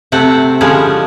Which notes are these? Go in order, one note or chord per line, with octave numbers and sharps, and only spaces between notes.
C3 A3 C4 F#5
D3 F3 G3 G#3 C#4